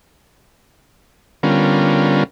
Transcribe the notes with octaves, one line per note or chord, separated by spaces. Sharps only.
D3 G3 B3 C#4 F4 A#4